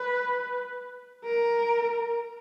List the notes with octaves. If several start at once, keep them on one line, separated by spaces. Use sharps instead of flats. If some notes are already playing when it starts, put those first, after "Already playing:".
Already playing: B4
A#4